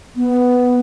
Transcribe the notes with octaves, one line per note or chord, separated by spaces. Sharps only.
B3